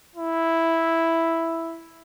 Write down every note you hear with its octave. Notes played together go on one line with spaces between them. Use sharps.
E4